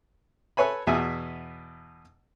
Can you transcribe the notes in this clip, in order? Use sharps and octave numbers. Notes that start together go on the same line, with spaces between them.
A4 B4 C#5 G#5 B5
E2 B2 E5 G#5